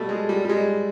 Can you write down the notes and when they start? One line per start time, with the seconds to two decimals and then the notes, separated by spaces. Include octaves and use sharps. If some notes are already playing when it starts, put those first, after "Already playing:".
Already playing: B2 G3 A3
0.09 G#3
0.29 G3
0.45 G3
0.49 G#3